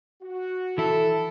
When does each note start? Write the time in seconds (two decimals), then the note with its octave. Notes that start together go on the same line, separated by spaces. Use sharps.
0.22 F#4
0.78 E3 E4 A4